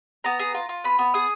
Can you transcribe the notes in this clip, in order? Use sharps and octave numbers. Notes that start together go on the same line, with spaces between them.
B3 A#5
G#4
F4
F4
B3 B5
B3
G#4 D#6